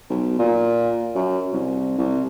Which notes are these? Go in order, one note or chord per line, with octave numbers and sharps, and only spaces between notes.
B1
A#2
F#2
C2
C2